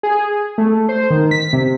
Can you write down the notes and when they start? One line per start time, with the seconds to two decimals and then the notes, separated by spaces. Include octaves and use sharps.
0.03 G#4
0.58 A3
0.89 C5
1.11 D#3
1.31 B6
1.53 C3